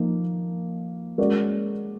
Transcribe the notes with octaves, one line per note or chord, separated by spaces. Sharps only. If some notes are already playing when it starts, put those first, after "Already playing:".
Already playing: F3 A#3 D#4
G#3 C#4 F#4 A#4 D5